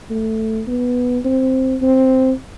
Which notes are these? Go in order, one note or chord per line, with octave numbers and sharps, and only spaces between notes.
A3
B3
C4
C4